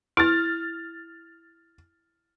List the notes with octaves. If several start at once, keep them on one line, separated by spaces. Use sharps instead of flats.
E4 F6 A6